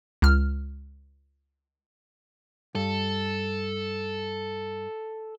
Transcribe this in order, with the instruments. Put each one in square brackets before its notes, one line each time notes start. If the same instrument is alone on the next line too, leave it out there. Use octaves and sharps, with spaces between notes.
[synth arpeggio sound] C#2 F6
[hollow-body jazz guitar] G2 [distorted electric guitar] A4